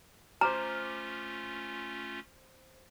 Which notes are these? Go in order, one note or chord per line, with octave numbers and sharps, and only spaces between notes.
A3 C#4 F4 C5 A#5 D6 F6